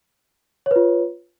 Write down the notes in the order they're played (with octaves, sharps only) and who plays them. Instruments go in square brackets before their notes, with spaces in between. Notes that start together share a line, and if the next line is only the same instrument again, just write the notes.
[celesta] C#5
B4
F4